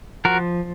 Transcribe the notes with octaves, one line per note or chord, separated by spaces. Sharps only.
F3 F#4 A#4